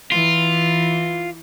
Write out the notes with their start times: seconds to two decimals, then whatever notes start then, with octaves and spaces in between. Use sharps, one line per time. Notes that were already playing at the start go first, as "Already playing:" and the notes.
0.12 E3 F4